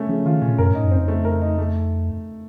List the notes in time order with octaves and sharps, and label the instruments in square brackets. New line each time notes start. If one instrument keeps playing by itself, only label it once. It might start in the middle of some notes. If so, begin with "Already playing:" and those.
Already playing: [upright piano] A3 C#4
[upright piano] C#3 [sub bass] F3
[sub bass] D#3 [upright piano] F4
[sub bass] A#2 [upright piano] C#4
[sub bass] F#2 [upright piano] A#4
[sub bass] A2 [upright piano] D#4
[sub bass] F#2
[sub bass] F2 [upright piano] C4
[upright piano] A3
A#4
D#4
A3